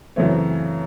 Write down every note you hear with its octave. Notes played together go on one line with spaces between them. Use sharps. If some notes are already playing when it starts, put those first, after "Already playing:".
F#2 C#3 E3 A3 C4 C#5